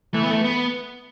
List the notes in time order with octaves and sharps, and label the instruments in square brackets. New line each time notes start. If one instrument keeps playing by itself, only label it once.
[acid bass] E3 [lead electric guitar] A3
[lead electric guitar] B3
A3
B3